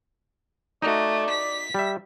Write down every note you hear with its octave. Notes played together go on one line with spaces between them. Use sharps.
A3 D#4 F#4 D5
B6
G3 E5